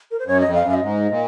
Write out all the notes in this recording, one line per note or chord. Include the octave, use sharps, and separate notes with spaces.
A#4
C5
F#2 C#5
D#5
F2
F5
F#2
F5
D#5
G#2
A#2